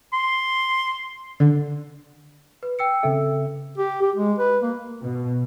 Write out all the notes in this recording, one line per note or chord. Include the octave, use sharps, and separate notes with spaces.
C6
D3
B4
G5 E6 C#7
C#3 C4 A4 E5
G4
G4
G#3
B4
A#3
B2